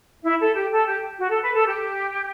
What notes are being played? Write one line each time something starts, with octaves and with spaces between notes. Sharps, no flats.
E4 E5
A4
G4
A4
G4
F#4
A4
B4
A4
G4